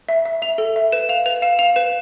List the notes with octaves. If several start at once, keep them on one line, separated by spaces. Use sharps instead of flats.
E5
E5
E5 F7
A4
E5
B4 E7
F5 F7
B4 F7
F5 E7
F5 F7
B4 E7